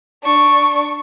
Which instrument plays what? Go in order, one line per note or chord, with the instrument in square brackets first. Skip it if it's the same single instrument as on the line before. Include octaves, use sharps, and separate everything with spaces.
[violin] D4 C#6